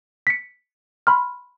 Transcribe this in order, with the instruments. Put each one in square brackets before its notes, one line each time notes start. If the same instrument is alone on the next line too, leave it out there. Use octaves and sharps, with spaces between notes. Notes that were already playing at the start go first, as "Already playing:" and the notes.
[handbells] B6 C#7
B5 C6 F6